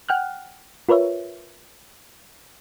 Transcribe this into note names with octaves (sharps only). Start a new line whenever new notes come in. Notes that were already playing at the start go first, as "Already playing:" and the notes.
F#5 G5 F6 F#6
F4 A#4 B4 C#5 E5